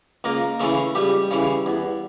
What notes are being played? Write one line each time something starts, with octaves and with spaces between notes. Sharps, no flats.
C#2 A#3 A#4
C#3 E3 A3 A4
C#2 G3 G4
C#3 E3
E2